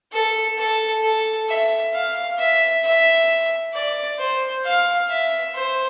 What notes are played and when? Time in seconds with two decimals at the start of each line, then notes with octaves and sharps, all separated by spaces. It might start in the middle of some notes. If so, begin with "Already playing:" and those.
0.12 A4
0.58 A4
1.03 A4
1.48 E5
1.94 F5
2.38 E5
2.84 E5
3.74 D5
4.18 C5
4.65 F5
5.09 E5
5.54 C5